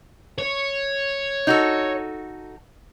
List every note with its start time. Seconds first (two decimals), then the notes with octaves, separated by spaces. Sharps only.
0.38 C#5
1.47 D#4 F#4 A4